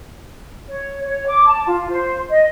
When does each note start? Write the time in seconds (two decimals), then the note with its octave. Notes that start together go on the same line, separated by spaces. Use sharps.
0.67 C#5
1.03 C#5
1.26 D6
1.47 A5
1.65 F4
1.89 C5
2.28 D#5